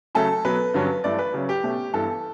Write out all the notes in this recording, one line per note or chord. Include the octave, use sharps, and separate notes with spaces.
C#3 F#3 A3 A4
B2 F#3 B3 B4
G2 D3 F#3 C#4
G2 E3 A3 D5
B4
C#3 F#3 C#4
G4
B2 A3 C#4
G2 E3 B3 A4